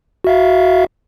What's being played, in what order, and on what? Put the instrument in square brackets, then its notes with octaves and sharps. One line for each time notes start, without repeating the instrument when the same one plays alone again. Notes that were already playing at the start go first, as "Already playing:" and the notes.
[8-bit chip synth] F#4 E5 F5